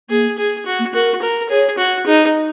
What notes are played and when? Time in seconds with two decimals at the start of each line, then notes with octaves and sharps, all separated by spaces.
0.10 A#3 G#4
0.38 G#4
0.66 F#4
0.79 A#3
0.94 F#4 A#4
1.22 A#4
1.49 G#4 C#5
1.78 F#4
2.06 D#4 G#4